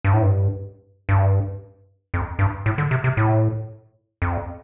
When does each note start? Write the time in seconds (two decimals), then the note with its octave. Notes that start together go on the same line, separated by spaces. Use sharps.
0.04 G2
0.14 A2
0.22 G2
1.09 G2
2.14 F2
2.39 G2
2.66 A2
2.78 D3
2.91 C3
3.04 C3
3.17 A2
4.22 F2